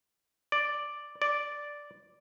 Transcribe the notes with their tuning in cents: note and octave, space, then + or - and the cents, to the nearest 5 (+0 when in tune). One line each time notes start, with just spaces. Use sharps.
D5 +0
D5 -5